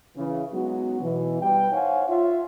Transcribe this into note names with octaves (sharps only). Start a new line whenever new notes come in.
C#3 E3
F#3 G#3 B3 C#4 D#4 F#4
B2 E3
G3 G4 B4 G5
D#4 C5 C#5 F5 F#5 G#5
F4 C#5 E5